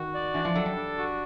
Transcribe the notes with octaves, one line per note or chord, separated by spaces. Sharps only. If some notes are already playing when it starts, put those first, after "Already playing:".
Already playing: D#3 F#4
D5
E3 D4
F3
F#3 A4
G3
D4
F#4